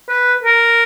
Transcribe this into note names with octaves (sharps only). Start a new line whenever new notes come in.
B4
A#4